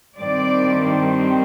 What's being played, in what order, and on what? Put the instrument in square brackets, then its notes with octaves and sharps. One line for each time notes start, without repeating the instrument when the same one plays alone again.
[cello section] G2 D#3 G3 C4 D5